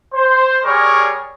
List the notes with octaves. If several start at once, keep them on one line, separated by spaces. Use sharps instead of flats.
C5
G3 G#4 A#4 C#5 D5 C#6